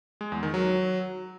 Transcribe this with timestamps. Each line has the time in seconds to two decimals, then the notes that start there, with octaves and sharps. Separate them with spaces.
0.21 G#3
0.32 E2
0.43 D#3
0.54 F#3